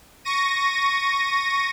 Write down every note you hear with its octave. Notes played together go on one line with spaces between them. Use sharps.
C#6 A#6 D#7